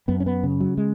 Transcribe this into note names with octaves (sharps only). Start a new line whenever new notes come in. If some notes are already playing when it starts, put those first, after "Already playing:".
F#2 B3
C#4
B3
C#3
F#3
G#3